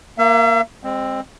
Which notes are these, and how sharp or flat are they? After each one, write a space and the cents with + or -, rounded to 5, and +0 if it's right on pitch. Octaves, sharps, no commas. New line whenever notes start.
A#3 +0 E5 +45
G#3 -25 C4 +10